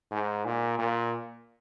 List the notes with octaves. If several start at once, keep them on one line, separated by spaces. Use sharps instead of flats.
G#2
A#2
A#2